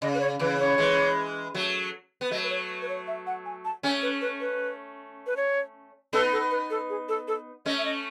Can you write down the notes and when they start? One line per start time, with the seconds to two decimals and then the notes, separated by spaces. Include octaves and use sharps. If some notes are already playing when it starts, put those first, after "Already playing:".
0.02 C#3 D#5
0.14 B4
0.21 C#5
0.39 C#3 E3 B4
0.59 C#5
0.78 E3 G#3
1.55 F#3 A3
2.21 B3
2.31 F#3 A3 D#5
2.43 B4
2.50 C#5
2.82 B4
2.89 C#5
3.07 E5
3.27 F#5
3.45 G#5
3.65 A5
3.83 A3 C#4 G#5
4.03 B4
4.21 B4
4.40 B4
5.27 B4
5.37 C#5
6.13 B3 D#4 A4
6.33 A4
6.51 B4
6.70 A4
6.90 G#4
7.09 A4
7.28 A4
7.65 A3 C#4 D#5
7.78 E5
7.85 D#5